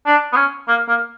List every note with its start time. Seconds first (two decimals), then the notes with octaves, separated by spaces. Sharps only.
0.06 D4
0.33 B3
0.36 C#4
0.68 A#3
0.88 A#3